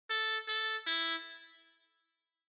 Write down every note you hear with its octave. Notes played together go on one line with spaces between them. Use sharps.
A4
A4
E4